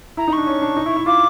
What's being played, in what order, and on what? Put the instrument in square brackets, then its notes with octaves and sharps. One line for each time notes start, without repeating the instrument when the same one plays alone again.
[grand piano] E4 [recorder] A#5
[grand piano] D#4
[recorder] C#6
[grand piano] D4
C#4
D4
D#4
E4
E4
[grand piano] F4 [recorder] D6